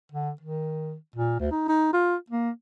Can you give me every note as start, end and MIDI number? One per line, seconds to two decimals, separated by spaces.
0.12 0.31 50
0.41 0.95 51
1.16 1.37 46
1.40 1.48 38
1.51 1.64 63
1.68 1.90 63
1.93 2.16 65
2.30 2.50 58